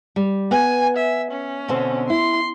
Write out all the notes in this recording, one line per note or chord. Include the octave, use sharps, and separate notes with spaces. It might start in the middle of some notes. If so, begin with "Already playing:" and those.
G3
B3 G#5
E5
C#4
B2 D3 C4
E4 C6